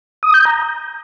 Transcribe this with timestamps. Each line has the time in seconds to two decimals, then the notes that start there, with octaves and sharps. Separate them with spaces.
0.23 D#6
0.34 G6
0.45 A#5